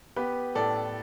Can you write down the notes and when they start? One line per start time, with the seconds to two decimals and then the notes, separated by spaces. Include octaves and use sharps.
0.16 B3 G4 B4
0.55 A2 A4 D5